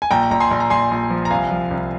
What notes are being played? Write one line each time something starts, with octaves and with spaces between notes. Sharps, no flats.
G#5
A#1 G5 A#5
A#1 A#5
G#5 C6
A#1
A#5
A#1 G#5 C6
A#1
F3
A#5
C2 F5 G#5
F3
C2